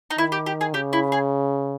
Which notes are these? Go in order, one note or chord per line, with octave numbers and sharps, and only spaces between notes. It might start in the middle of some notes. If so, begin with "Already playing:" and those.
D#4
D#3 E4
G4
G4
G#4
C#3 G4
E4
G#4